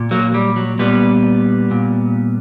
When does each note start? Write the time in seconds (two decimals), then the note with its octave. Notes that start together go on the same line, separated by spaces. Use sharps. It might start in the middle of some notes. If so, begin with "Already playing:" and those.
Already playing: A#2
0.11 F#3 A#3
0.34 G3
0.56 F#3
0.79 A#2 G3 B3
1.71 A#2